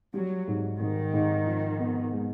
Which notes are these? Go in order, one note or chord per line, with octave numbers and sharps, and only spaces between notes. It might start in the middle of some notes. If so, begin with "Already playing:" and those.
F#3 G3
G#2
G#2 D#3
G#2
F3
B3
G#3